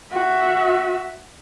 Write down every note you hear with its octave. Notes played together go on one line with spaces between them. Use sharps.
F#4 E5